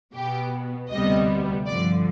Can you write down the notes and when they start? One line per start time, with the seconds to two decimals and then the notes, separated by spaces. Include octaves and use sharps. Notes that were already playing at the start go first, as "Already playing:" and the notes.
0.14 B2 B3 G4
0.90 D2 C3 G3 B3 D#5
1.66 G2 D3 F3 D5